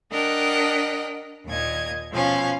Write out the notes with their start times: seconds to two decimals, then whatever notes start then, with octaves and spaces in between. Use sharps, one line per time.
0.12 D4 A#4 D#5 F#5 G5
1.46 D#2 A#2 D#5 G#6
2.12 B2 F3 C#4 F5